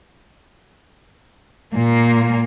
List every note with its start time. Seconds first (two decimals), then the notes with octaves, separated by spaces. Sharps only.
1.75 A#2 A#3